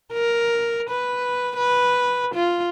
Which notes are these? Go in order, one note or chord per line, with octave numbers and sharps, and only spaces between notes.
A#4
B4
B4
F4